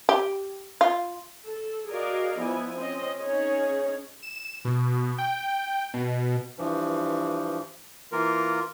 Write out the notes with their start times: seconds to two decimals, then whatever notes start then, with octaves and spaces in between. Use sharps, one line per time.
0.09 G4
0.81 F4
1.45 A4
1.89 F#4 G#4 A#4 D5 D#5 F5
2.38 F3 B3 E4 G#5
2.80 C4 C#4 D#5
3.21 C#4 D#4 G#4 C#5
4.23 E7
4.65 B2
5.18 G5
5.94 B2
6.58 G2 E3 F3
8.12 E3 A#3 F4 A#4